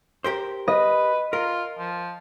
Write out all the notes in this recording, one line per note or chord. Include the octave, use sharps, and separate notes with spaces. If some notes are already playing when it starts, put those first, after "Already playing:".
G4 A#4 C5
B4 D#5
F4 A#4
F3